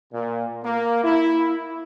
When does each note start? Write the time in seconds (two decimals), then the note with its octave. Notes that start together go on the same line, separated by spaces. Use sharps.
0.13 A#2
0.64 A#3
1.04 E4